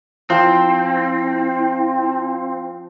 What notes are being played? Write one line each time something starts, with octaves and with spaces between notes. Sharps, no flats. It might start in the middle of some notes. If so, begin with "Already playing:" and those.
F3 C4 E4 G5
E4